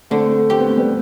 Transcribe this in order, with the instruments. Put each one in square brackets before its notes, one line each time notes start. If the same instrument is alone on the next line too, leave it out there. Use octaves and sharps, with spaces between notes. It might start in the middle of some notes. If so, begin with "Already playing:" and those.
[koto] D3 [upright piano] A3 C4
[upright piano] C4 [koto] G4
[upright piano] B3
A3
G3 B3